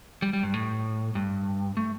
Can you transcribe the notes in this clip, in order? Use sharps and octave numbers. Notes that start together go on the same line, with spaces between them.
G3
G3
G2
A2
G2
A3